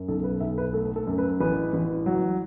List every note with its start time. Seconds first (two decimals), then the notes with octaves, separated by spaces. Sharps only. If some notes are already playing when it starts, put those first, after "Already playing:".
Already playing: F#2
0.08 B1 A4
0.24 B4
0.40 B1 E5
0.58 B4
0.73 A3 A4
0.96 A4
1.07 F#2
1.18 B4
1.40 A1 B4
1.73 A1
2.06 F#3